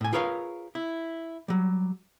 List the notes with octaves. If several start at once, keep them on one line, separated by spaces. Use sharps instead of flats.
A2 G#5
F4 G#4 A#4 B4 C#5 F5
E4
F#3 G3